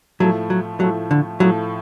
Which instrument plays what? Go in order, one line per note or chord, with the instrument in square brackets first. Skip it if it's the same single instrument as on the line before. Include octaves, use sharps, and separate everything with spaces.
[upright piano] A2 F3 A3 [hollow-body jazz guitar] F#3
[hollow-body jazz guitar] F#3
[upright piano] A2 F3 A3 [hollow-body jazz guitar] F#3
[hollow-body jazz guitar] D3
[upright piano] A2 F3 A3 [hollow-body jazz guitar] F#3